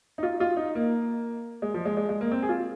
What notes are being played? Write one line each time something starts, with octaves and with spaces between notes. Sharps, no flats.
D#4
F4
F4
D#4
A#3
G#3
F3
G#3
G#3
G#3
A#3
C4
G#4
F4